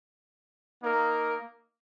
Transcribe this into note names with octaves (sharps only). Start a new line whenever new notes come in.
A#3 D#4 A#4